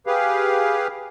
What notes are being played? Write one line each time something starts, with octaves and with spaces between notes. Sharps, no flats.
G4 G#4 B4 F5